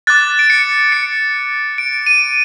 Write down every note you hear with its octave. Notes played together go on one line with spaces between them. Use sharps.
D6 F#6 A6
D7
C#7
C#7
D7
D#7